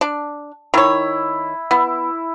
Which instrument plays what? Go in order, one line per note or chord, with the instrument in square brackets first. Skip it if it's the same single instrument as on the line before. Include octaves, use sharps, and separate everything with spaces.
[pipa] D4
[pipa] D#3 C#5 [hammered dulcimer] E4
[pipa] B3 [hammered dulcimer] E4